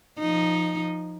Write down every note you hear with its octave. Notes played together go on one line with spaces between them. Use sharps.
F3 D#4